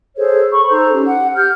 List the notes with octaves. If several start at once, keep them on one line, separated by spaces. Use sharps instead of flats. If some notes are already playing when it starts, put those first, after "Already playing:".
G#4 A4 C5 C#5
B5 C#6
D#4 A4 C5 A#5
C#4 G4
F#5
G4 F6 G6